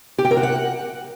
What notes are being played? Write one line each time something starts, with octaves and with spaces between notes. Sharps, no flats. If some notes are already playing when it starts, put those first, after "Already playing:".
G4
G5
A#4
F#4
F#5